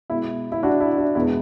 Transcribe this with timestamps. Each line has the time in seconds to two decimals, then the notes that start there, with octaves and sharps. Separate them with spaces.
0.10 B2 G#3 B3 E4
0.52 E4
0.63 D4 F#4
0.81 E4
0.98 D4
1.15 E2 B2 G#3 B3 E4